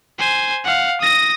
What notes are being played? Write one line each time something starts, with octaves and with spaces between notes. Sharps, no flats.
C5 G#5
F5 F#5
D#6 A#6